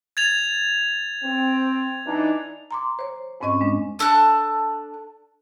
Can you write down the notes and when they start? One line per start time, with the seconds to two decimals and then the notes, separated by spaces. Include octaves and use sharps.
0.17 G#6 A6 F7
1.24 C4
2.06 E3 D4 D#4
2.71 A#5 C6 D6
2.99 C5 C#5
3.41 F2 G#2 C4 C#4 D#5 C#6
3.61 G#3 D4
3.99 D4 A4 A5 F#6